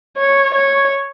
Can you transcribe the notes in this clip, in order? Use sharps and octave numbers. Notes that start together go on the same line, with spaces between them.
C#5
C#5